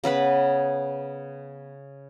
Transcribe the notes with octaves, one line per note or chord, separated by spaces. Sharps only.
C#3 B3 B4 B5